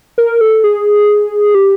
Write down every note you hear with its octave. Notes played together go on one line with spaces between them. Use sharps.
A#4
A4
G#4
G4